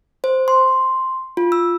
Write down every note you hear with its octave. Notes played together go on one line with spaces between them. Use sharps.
C5
C6
F4
E6